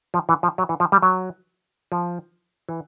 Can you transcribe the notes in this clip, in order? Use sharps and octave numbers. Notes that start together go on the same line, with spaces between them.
F3
E3
F3
F#3
E3
F3
G3
F#3
F3
E3